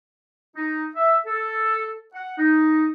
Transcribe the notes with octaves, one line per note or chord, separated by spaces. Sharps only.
D#4
E5
A4
F#5
D#4